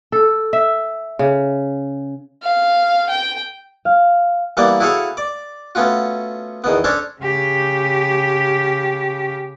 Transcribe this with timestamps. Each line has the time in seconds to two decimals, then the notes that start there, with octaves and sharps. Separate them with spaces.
0.12 A4
0.53 E5
1.19 C#3
2.43 F5
3.09 G5
3.85 F5
4.57 E3 G3 A#3 B3 D5
4.80 E4 F#4 G#4 A4 C#5 F5
5.17 D5
5.75 A3 B3 C#4 F4 F#4
6.64 E2 D#3 B3
6.84 C#4 D4 A4 C5 C#5
7.21 C#3 G4